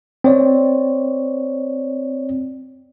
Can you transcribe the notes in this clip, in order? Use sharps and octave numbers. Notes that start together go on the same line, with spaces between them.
C4 C#5 D5